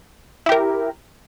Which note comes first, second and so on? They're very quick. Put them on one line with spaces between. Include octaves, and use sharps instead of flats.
E4 G4 A#4